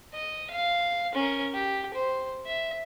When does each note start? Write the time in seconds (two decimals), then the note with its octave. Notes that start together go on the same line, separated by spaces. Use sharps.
0.14 D#5
0.50 F5
1.14 C#4 A#4
1.54 G4
1.94 C5
2.46 E5